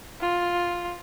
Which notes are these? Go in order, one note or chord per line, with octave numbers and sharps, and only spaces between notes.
F4